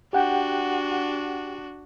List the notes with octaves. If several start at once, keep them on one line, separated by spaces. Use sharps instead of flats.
D4 F#4 G4 F#5 G5